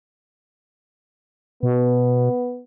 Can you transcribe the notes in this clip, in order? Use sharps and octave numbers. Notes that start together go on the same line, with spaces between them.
B2 B3